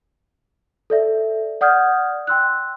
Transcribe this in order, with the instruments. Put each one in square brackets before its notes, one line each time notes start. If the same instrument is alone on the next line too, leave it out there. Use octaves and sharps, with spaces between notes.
[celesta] A4 D5 E5
D5 F#5 D#6 F6 G6 G#6
G5 C6 E6 F#6